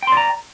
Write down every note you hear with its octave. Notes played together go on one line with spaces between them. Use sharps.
D5 G5 A#5 C6